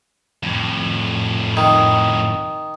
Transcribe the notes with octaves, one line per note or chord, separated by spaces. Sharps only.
F2 A2
D#3